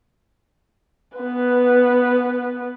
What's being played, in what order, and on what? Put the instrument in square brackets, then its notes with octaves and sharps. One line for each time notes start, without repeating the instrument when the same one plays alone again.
[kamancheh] B3 B4